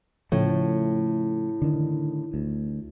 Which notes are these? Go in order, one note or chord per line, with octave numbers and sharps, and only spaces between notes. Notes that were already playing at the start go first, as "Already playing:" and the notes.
A2 C#3 F3 A3
D3 D#3
D2